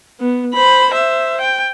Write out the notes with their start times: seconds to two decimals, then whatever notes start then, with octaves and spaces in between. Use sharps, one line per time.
0.20 B3
0.54 C5 B5
0.92 C5 E5
1.41 G5